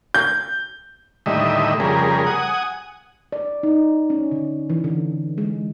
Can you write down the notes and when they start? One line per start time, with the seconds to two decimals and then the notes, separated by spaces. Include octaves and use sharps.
0.14 G6
1.26 D#2 A2 D3 G3 D#5 E5
1.80 F2 C#3 G3 G#4 A#4
2.27 F#5 G#5 D#6
3.32 D5
3.63 D#4
4.10 C#4
4.32 D3
4.70 E3
4.84 D3
5.38 G#3